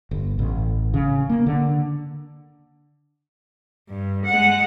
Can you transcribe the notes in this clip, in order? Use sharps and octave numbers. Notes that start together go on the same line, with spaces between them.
G1
A1
C#3
A#3
D3
G2
G#3 F#5